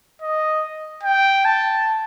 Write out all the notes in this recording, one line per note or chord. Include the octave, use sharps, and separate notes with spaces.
D#5
G5
A5